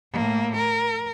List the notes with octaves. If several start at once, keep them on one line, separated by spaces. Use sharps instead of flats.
A2 A#3
A#4